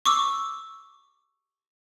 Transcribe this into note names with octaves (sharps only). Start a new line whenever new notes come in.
C#6 D6 E6